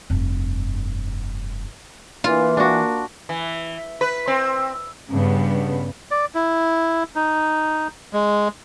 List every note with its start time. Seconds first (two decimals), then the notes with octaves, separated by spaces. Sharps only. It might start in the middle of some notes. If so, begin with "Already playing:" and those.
0.10 F1 G2
2.24 E3 A#3 F4
2.57 D4 F#4
3.29 E3
4.01 B4
4.27 C4
5.11 G2 C#3 B3
6.11 D5
6.35 E4
7.16 D#4
8.13 G#3